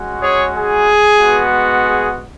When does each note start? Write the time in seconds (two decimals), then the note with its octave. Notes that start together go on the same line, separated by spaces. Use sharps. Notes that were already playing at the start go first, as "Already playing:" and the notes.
Already playing: G#3 C#4 F#4
0.21 G#4 C#5
0.54 G#4
1.19 G#3 B3 F#4
1.84 G#4